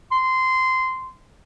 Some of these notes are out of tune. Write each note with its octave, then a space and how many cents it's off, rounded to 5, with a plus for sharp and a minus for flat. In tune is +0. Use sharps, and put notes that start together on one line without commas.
C6 -15